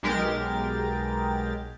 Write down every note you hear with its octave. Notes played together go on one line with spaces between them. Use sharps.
B1 G#3 G4 A#4 A6